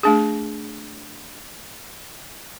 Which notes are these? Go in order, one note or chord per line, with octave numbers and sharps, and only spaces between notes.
A3 D4 G#4